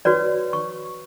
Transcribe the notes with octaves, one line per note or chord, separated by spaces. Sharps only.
F#4 B4 C#5 D5
C#6